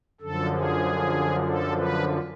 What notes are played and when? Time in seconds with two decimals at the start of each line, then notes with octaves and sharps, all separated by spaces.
0.21 F#2 D3 F3 A4
0.52 G#4
1.46 A4
1.77 B4